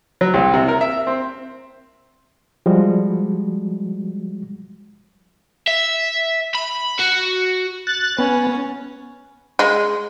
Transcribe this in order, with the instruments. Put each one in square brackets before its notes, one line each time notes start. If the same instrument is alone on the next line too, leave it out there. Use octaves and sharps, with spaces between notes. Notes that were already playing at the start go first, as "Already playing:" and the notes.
[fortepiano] F#3
C2
C3
A#4
E5
C4
[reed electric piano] F3 G3 G#3 F#4
[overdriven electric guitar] E5
B5
F#4
[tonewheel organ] F#6 A6
[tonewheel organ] B3 [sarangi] C#4
[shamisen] G#3